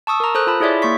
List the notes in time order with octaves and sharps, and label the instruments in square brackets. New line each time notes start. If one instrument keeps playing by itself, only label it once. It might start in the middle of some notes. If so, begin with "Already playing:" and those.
[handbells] A5 C#6 D#6 E6
A#4 A#5
A4 C5 D#6 F#6
F4 A5 B5
E4 G#4 C#5 D5 E5 D6
A#3 C6 C#6 B6